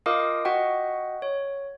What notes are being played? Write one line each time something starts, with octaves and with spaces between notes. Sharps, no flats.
F4 A#4 D#5 F5 D6 D#6
F#4 D#5 F#5 G5
C#5